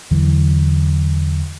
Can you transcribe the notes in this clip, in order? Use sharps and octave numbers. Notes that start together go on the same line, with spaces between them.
E2 D3 E3 F#3